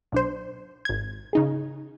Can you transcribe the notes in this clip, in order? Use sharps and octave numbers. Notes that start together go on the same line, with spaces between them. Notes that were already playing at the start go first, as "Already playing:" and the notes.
B1 D4 C5
G#1 G#6
C#3 D#4 G#4